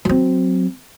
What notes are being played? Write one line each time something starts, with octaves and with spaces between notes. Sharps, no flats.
F#3 C4